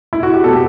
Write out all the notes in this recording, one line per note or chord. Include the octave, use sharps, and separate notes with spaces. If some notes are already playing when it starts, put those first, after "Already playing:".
E4
F#4
G4
B2 A3 A4
G4